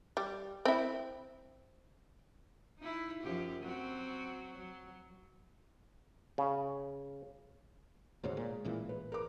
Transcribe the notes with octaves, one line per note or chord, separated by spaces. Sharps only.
G3
C4 E4
D#4 E4
F#2 F3 G4
F#3 C4 F#4
F#3
C#3
D2 G#2 C3 F#4 C5 C#5
A#2 G#3
A1 A#2 E3
B4
A#4 B4 D6